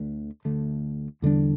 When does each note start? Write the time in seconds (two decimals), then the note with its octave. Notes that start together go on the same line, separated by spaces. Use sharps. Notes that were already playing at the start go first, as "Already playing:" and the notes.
Already playing: D2 D3 A3
0.45 D2 D3 A3
1.22 E2 D3 G3 D4